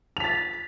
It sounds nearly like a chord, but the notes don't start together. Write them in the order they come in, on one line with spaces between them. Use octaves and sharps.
F7 B6 A6